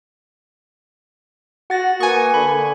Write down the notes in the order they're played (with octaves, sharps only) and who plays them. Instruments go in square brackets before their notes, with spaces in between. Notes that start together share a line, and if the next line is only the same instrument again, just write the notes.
[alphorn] F#4 [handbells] F#5 A6 A#6
[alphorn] A#3 [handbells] B4 D#6 [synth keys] G#5 C#6
[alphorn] D3 [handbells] B5